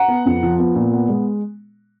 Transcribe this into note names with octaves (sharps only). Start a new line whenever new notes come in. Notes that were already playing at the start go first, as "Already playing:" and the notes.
Already playing: F#5 A#5
B3
F2
F3
B3
A#2
B3
G#3